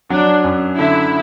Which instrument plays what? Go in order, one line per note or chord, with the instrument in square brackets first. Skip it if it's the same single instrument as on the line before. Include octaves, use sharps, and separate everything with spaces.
[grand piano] F#3 [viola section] D4
[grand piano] F#2
[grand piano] D3 [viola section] E4